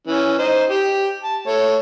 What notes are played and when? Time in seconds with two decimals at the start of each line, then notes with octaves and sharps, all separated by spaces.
0.07 E3 C#4
0.39 D#4 C5
0.70 G4
1.24 A5
1.47 A3 C#5